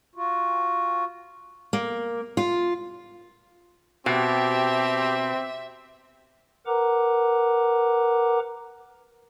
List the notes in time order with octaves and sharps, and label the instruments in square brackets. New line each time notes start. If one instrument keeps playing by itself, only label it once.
[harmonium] F4 F#4
[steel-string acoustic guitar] A#3
F4
[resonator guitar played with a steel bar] B2 [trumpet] C4 [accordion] G4 [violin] E5
[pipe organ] A#4 B4 F#5 A#5 D6